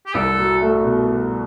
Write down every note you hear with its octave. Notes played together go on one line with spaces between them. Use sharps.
G4
C2 A4
F#3
A3
B2